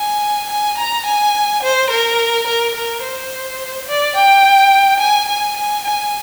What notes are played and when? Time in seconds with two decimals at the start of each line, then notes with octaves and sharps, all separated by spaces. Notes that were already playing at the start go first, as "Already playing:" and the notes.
Already playing: G#5
0.50 G#5
0.78 A#5
1.06 G#5
1.63 C5
1.90 A#4
2.47 A#4
2.75 A#4
3.03 C5
3.88 D5
4.16 G5
5.00 G#5
5.29 G#5
5.57 G#5
5.85 G#5